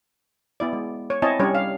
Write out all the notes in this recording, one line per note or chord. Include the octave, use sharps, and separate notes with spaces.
B3 E4 D5
G#3
C#5
C4 E4 C#5 D#5 G#5 A5
G3 C#4 D4 C#5 D5
F5